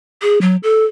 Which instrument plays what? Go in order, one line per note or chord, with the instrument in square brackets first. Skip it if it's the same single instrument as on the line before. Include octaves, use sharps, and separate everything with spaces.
[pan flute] G#4
F#3
A4